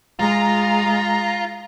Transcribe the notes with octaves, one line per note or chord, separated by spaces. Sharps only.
G#3 F4 A#5